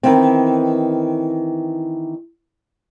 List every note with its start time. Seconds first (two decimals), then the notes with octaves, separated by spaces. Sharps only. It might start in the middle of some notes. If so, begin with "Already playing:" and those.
0.03 D#3 E3 B3 C4